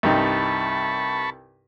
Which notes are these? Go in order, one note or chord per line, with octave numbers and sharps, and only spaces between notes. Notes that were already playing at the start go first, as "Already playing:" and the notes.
C2 G2 D#4 A5 B5 C#6